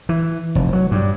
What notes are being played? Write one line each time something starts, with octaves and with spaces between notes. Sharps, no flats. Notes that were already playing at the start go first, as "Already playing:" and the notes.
E3
F1
F#3
G2